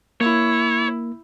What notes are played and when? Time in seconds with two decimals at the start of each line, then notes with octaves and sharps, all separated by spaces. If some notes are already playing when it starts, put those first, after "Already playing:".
0.21 A#3 E4 C#5